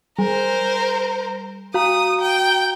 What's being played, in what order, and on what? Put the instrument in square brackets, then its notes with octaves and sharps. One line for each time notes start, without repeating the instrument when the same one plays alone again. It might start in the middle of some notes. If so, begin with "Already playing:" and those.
[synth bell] G3 [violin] A#4 C5
[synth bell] F#4 F5 A#5 [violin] D#6
[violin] G5